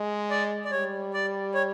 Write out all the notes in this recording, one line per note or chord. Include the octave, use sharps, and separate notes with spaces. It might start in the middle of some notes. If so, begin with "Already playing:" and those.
Already playing: G#3
D5
D5
G3 C#5
D5
C#5